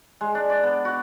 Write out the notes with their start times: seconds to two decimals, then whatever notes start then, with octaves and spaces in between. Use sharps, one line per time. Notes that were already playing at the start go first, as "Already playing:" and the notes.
0.21 G#3
0.35 D4
0.50 D5
0.64 B3
0.85 F#4